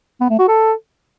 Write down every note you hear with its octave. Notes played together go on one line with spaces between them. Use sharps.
B3
A3
F#4
A4